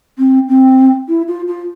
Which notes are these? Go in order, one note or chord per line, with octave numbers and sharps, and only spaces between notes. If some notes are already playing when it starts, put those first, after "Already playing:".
C4
C4
E4
F4
F4